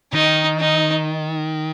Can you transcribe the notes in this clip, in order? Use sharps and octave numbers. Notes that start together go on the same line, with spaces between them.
D#3 D#4
D#4